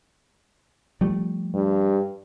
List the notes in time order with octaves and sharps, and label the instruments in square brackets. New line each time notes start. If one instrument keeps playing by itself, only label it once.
[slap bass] F3 G3 A3
[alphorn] G2